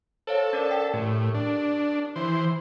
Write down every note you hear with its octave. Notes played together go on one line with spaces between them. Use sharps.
A4 C5 C#5 F5
C#4 A#4 D5
G5 B6
A2 G4 A#4
D4
E3 C5